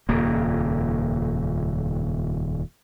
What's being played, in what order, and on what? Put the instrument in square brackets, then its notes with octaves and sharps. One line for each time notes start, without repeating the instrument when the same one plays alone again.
[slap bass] D#1 F2 C#3 A#3